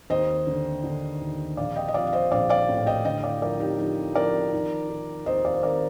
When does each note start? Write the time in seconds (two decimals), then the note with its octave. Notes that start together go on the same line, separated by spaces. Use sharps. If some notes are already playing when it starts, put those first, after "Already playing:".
0.10 D#2 C5 D#5
0.47 D3
0.84 D3
1.21 D#2
1.57 A#1 D5 F5
1.76 D#5 G5
1.88 D#5
1.94 F3 D5 F5
2.07 F5
2.13 C5 D#5
2.31 A#1 D5 F5
2.49 D5 F5
2.69 A2
2.86 D#5 G5
3.05 D3 D#5 G5
3.23 D5 F5
3.42 F3 A#4 D5
3.60 D#4 G4
3.78 F3 D#4 G4
4.15 F3 A#4 D5
4.52 D#3
4.89 D#3
5.26 D#2 C5 D#5
5.45 D5 F5
5.54 C5
5.63 D#2 A#4 D5